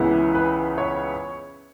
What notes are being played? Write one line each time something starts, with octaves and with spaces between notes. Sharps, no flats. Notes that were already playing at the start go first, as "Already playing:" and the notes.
Already playing: C#2 C#3 E3 B3 E4
B4
C#5